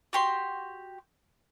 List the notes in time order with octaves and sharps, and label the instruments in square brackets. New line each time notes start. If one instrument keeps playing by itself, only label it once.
[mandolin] F#4 G4 C6